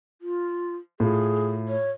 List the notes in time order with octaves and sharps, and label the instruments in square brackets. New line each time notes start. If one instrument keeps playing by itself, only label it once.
[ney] F4
[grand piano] A2 F4 [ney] G#4
[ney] C#5